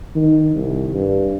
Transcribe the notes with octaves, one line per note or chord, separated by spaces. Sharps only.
D#3
C2
G2